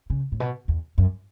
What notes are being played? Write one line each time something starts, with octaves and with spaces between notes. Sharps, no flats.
C#3
A2
B2
E2
F#2